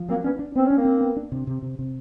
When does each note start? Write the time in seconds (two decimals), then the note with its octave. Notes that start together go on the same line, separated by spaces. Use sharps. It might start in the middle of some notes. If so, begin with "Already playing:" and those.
Already playing: F3
0.09 F#3 A#3 C4
0.24 B3 C#4 D4
0.39 D4
0.55 B3 C4
0.65 C#4 D4
0.77 A#3 C4
0.85 D4
1.01 B3
1.17 D4
1.32 C3
1.47 C3
1.63 C3
1.79 C3